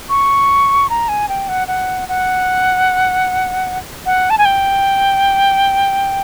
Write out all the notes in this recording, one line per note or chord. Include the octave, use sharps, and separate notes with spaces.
C#6
A#5
G#5
G5
F#5
F#5
F#5
F#5
A5
G#5
G5